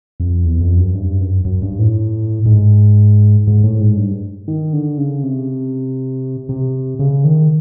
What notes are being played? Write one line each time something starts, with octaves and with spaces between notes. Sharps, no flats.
F2
E2
F2
F#2
G2
F#2
F#2
G2
A2
G#2
G#2
A2
G#2
G2
D#3
D3
C#3
C3
C3
C#3
D#3